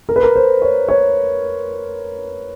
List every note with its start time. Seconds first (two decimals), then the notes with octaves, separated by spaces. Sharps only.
0.09 A#4
0.16 B4
0.23 A#4
0.36 C5
0.62 C#5
0.89 C#5